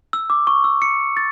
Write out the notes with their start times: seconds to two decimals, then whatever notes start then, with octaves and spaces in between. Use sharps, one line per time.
0.13 E6
0.30 D6
0.47 C#6
0.64 E6
0.82 C#7
1.17 A6